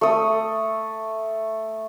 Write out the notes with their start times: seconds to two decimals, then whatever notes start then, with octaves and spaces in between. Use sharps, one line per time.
0.01 A3 D#6